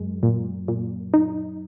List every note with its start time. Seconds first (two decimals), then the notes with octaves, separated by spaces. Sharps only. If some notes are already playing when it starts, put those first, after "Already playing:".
Already playing: F#2 G#3
0.23 A#2
0.68 A#2
1.14 D#4